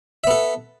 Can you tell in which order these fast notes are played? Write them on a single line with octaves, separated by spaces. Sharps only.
E5 B3 A4